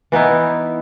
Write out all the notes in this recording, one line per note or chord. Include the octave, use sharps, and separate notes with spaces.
E3 B3 D#4 E4